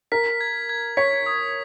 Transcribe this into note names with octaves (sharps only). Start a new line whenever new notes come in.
A#4 B6
G#6
G#6
C#5 B6
D#6